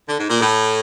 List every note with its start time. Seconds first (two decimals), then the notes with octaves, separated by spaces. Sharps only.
0.08 D3
0.19 G#2
0.29 A#2
0.40 A2